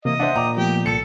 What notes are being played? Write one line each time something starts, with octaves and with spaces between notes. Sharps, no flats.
C3 E3 A#3 D#5
D4 C5 E5 F#5
A#2 G5 A#5 D6
F3 A3 B3 G4
C2 A4 C#7